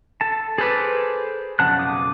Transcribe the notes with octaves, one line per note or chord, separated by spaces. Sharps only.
A4 A5
G#4 A4 B4 C5 D6
B1 F2 C#3 F#5 A5 F#6
D6 D#6